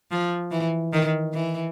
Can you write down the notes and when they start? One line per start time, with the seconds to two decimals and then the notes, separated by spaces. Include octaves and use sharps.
0.11 F3
0.51 E3
0.93 D#3
1.34 E3